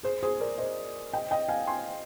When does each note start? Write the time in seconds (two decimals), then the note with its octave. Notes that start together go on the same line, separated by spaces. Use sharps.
0.03 G#4 C5
0.23 G#4 C5
0.40 A#4 D5
0.58 C5 D#5
1.13 D#5 G5
1.31 D#5 G5
1.49 F5 G#5
1.67 G#5 C6